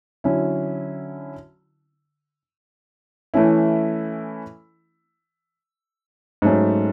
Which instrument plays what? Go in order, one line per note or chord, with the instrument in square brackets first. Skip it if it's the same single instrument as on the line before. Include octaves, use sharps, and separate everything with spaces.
[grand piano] D3 F#3 C#4 E4
E3 A3 C#4 E4
G#2 F#3 A3 C#4